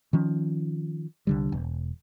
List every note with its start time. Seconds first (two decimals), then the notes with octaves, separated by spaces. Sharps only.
0.13 D#3 F3 C#4
1.27 C2 D3 G3
1.52 E1